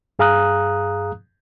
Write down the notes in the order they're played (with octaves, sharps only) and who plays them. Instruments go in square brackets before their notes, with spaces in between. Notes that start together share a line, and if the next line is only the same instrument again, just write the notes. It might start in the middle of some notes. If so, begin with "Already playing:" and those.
[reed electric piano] G2 G#4 F5 A#5 D#6 F#6